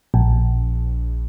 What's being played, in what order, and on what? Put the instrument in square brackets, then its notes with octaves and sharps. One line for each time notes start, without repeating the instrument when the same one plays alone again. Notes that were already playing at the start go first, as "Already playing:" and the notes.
[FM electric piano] A#1